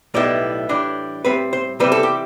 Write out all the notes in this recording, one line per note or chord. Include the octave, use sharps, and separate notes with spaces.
B1 A2 G3 B3 E4 D5
A2 E3 G3 D4
A2 G3 C4 B4
C5
C3 E3 G3 C4 E4 B4
A4
G4